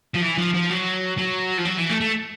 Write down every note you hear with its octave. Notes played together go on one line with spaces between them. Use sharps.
F3
E3
F3
F3
F#3
F#3
F3
F#3
E3
A3
A3